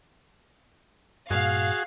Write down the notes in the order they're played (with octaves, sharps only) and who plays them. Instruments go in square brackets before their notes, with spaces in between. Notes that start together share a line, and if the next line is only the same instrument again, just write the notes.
[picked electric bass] G2 A#2 [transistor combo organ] F#4 G#4 [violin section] F5